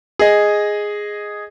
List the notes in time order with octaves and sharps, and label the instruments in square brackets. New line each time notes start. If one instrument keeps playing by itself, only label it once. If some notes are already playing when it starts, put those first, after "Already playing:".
[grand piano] G#4 D#5